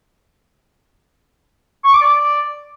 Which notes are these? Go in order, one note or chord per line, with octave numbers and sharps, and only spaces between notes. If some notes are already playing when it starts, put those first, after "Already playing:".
C#6
D6
D5